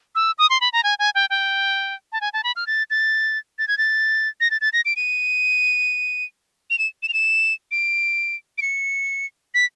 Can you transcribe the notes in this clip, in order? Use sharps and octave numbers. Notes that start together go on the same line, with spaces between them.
E6
D#6
C6
B5
A#5
G#5
G#5
G5
G5
A5
G#5
A5
B5
F6
A6
A6
A6
G#6
A6
A#6
A6
A6
A#6
D7
D#7
F7
E7
E7
F7
E7
D7
D7
C#7
B6